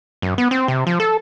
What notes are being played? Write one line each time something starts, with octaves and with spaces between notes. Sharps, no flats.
F#2
B3
C4
C3
F3
A4